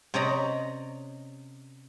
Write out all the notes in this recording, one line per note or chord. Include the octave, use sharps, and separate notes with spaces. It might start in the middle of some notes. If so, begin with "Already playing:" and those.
C3 C#4 D5 D#5 A#5 B5